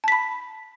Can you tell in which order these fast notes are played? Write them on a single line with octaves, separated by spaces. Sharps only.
A5 B6 B5